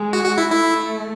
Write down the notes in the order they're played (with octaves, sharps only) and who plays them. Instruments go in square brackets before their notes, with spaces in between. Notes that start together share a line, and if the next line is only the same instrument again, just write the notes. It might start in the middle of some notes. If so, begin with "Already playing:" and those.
Already playing: [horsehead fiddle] G#3
[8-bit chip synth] F#4
F#4
E4
[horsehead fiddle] A3 [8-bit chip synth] E4